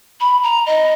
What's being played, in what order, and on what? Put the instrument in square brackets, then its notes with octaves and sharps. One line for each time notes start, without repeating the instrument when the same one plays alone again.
[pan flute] B5
A#5
D#5